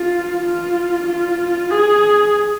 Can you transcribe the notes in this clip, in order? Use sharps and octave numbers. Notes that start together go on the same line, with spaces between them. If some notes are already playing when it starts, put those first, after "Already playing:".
Already playing: F4
F4
F4
G#4